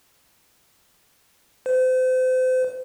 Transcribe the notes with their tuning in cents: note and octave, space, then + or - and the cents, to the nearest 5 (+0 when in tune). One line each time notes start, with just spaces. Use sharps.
C5 -35